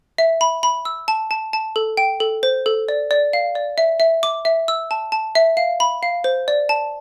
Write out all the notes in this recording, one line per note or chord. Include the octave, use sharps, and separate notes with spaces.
E5
B5
B5
E6
A5
A5
A5
A4
G5
A4
C5
A4
D5
D5
F5
D5
E5
E5
D6
E5
E6
A5
A5
E5
F5
B5
F5
C5
D5
A5